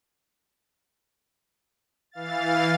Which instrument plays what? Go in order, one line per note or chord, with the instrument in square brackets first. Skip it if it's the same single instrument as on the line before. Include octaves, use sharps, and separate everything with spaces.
[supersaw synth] E3 F5 A6